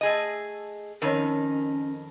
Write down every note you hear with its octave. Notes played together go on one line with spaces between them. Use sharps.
A3 G#4 D#5
F2 D#3 C#4 A#4 C#5